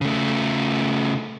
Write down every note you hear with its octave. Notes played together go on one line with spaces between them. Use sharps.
C#3 A3